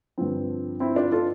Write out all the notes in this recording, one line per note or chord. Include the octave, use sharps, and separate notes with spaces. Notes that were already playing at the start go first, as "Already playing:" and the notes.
G2 D3 F3 C4
C4 E4
D4 F4
F4 A4